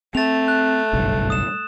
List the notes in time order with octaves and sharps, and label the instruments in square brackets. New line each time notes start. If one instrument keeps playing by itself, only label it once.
[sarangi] A3 [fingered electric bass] C4 [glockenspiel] A6 F7
[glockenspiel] F#6
[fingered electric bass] F#1 B1 G2
[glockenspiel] D#6 E7